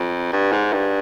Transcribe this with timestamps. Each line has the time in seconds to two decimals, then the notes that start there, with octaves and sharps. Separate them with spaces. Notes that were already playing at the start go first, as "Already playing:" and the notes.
Already playing: F2
0.32 G2
0.52 G#2
0.73 G2